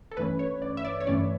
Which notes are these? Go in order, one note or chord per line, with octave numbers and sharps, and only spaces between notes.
A4
G2 E3 A3 C#4 B4
C#5
D5
E5
D5
C#5
G2 E3 A3 C#4 D5